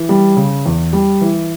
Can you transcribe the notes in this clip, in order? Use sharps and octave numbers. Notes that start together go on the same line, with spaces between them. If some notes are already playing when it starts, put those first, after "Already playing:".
Already playing: E3
G3
C#3
E2
G3
E3